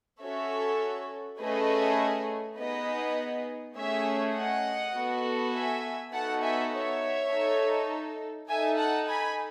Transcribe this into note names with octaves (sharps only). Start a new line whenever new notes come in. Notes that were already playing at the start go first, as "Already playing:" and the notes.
C#4 F#4 A4 C#5 E5
A3 C#4 G#4 B4 D#5
B3 D#4 G#4 B4 D#5
A3 C#4 G#4 C#5 E5
D#5 F#5
B3 F#4 A4
E5 G#5
B3 D#4 F#4 A4 F#5 A5
E5 G#5
C#5 E5
D#4 A4
D#4 A4 E5 G#5
F#5 A5
G#5 B5